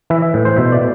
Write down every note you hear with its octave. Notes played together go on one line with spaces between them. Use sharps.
E3 E5
E5
A2
C5
B2 E5
D5